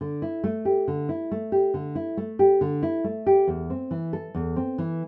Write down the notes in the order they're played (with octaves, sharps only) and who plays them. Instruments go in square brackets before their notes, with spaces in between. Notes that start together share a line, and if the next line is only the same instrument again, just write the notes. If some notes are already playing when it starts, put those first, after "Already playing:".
[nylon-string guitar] D3
E4
A3
G4
D3
E4
A3
G4
D3
E4
A3
G4
D3
E4
A3
G4
E2
C4
E3
A4
E2
C4
E3